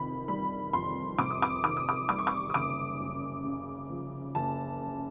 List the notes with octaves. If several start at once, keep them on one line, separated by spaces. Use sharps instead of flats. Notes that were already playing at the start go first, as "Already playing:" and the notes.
Already playing: F2 C3 D#3 B5
G3 B5
F2 C6
C3 D6
D#6
D6
D#3 D6
D#6
D6
G3 D6
C#6
D6
D#6
F#1 D6
F#2
C#3
F3
F#1 A5
F#2